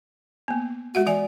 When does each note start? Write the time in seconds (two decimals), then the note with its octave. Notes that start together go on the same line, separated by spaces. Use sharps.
0.48 A#3 B3
0.95 G#3 F#4 E5 F#5
1.07 E3 D5 E5 G#5